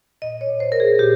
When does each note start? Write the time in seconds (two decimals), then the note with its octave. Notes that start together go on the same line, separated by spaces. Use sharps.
0.22 A#2 D#5
0.41 C#5
0.47 A#2
0.60 C5
0.72 A#2 A#4
0.80 G#4
0.99 A#2 G4